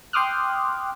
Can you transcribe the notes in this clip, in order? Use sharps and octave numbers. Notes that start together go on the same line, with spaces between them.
G5 C6 D6 D#6 F6 F#6